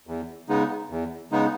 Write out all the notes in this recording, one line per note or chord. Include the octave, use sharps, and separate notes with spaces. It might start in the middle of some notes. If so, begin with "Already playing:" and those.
E2
C#3 G#3 B3 D#4
E2
C#3 G#3 B3 D#4